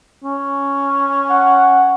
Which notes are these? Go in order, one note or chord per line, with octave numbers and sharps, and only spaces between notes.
C#4
F#5